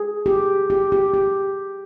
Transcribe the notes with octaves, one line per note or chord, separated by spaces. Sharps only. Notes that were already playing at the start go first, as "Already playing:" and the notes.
Already playing: G#4
G4
G4
G4
G4